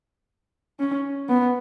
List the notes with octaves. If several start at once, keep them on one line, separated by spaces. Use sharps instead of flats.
C#4
B3